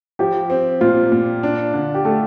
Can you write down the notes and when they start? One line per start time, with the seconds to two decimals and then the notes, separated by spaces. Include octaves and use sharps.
0.19 F3 G4
0.50 C4
0.81 A#2 F4
1.12 A#2
1.43 D4
1.74 D3
1.94 G4
2.05 A3 A4